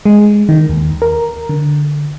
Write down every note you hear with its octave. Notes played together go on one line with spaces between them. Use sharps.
G#3
D#3
D#2
A#4
D3